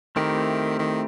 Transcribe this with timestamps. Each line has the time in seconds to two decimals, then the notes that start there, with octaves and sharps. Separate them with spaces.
0.16 D#3 A3 C4 E4 G4 A#4
0.79 D#3